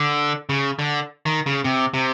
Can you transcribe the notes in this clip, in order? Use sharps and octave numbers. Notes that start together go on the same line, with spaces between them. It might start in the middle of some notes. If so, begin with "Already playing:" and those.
Already playing: D3
C#3
D3
D#3
C#3
C3
C3